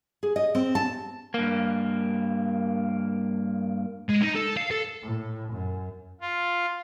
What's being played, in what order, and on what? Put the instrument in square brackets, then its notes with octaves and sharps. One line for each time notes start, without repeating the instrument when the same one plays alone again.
[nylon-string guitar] G#4
D#5
C4
A5
[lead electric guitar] G2 A#3
[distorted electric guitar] G#3
D#4
A4
F5
A4
[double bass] A2
F#2
[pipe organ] F4